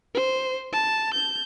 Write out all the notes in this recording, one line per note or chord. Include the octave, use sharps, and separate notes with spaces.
C5
A5
G6